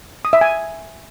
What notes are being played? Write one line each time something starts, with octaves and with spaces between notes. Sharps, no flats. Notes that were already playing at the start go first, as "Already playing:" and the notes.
D#6
E5
G#5